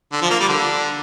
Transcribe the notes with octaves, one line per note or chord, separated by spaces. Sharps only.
D3
F3
A#3
G3
D3